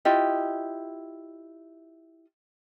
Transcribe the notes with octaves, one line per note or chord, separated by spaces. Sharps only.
E4 F4 G4 D#5